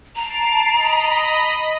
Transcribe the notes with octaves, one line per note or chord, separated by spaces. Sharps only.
A5 A#5 C7 D7
D#5 B5